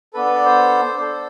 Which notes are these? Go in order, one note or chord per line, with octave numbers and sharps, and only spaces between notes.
B3 D4 A4 B4
B4
D5
C5
D4 A4